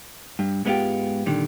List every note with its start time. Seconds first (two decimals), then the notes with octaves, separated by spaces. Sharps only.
0.39 G2
0.65 G#2 G#3 B3 C#4 F4 G4
1.26 A#2 D3 D#3 G3